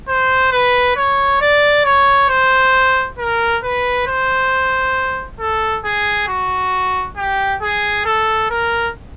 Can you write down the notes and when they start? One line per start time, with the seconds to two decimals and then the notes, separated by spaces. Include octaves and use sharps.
0.08 C5
0.52 B4
0.96 C#5
1.41 D5
1.85 C#5
2.29 C5
3.18 A#4
3.63 B4
4.08 C5
5.40 A4
5.85 G#4
6.28 F#4
7.17 G4
7.62 G#4
8.05 A4
8.50 A#4